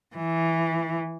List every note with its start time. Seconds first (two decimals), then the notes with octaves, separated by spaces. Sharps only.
0.16 E3